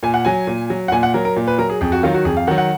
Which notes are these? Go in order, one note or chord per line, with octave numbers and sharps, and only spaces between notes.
A#2 G#5
F#5
F#3 G#5
A#2
F#3
F#5
A#2 G#5
F#5
F#3 A#4
A#4
A#2
B4
F#3 A#4
G#4
F2 G#4
F#4
D#3 F#3 F4
F#4
F2 G#4
F5
D#3 F#3 F#5
F#5